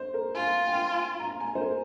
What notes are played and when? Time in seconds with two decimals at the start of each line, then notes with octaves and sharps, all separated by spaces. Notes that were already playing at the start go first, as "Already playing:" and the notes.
Already playing: C5
0.14 A#4
0.35 F4 G#5
0.67 G5
1.19 A#5
1.40 G#5
1.55 C5
1.61 A#4